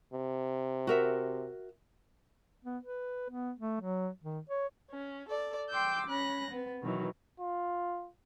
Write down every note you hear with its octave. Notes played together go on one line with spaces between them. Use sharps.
C3
F#4 A#4 E5
B3
B4
B3
A3
F#3
D#3
C#5
C#4
A4 D5
G5 C6 D6 E6 G6
C#4 B5 F#6 A#6
B3 C4 B4
B2 D#3 E3 F#3
F4